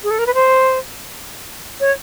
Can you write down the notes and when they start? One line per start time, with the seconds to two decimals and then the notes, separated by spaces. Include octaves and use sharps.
0.04 G#4
0.11 A4
0.19 A#4
0.26 B4
0.34 C5
1.80 C#5